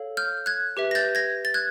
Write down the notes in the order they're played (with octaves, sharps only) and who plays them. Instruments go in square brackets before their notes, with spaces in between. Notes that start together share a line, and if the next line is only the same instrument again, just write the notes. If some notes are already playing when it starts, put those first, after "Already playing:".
Already playing: [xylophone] A4 C#5 F5
F6 G6
F#6 G#6
G4 B4 E5
A#6
G6 A6
G#6 A#6
A6
F#6 G#6